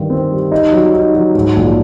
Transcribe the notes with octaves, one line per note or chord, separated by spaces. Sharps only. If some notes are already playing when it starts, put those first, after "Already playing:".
Already playing: G2 D#3
C4
G3
D#4
F#3
D#4
F#3
G#2
A#1